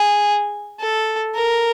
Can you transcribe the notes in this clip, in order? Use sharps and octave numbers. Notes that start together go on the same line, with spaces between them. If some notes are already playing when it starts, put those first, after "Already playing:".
Already playing: G#4
A4
A#4